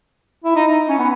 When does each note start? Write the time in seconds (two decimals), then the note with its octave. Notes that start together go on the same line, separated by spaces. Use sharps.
0.44 E4
0.56 D#4
0.89 C#4
0.99 B3